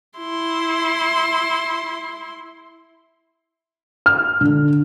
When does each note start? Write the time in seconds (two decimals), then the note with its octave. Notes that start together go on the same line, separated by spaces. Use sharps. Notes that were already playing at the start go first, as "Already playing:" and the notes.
0.18 E4 C6
4.06 F6
4.41 D3